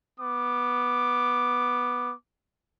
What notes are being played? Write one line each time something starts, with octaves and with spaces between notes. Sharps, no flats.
B3 D6